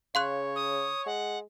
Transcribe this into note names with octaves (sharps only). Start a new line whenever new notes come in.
C#3 C#5 F5 C6 F#6
D#6
G#3 F#5